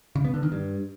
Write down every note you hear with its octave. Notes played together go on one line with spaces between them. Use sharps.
C#3
B3
D3
D#3
G2